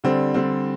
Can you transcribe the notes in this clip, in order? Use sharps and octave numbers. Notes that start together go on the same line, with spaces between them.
D3 G3 C4
D3 G3 C4